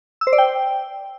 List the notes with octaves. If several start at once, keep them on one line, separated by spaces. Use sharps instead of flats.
E6
C5
D5
G5